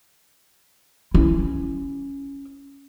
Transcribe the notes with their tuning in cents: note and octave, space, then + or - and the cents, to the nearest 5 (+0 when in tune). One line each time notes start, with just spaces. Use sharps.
C#4 +0 E4 +5